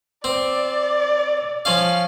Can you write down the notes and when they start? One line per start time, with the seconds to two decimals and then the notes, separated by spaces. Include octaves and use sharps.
0.24 C4 D5
1.65 F3 C#4 F5